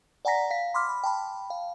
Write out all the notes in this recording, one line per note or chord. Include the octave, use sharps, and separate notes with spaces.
D5 F#5 G#5 A#5 A#6 B6
F5 B6
B5 C6 D6 F6
B5
G5 A5 B5
F5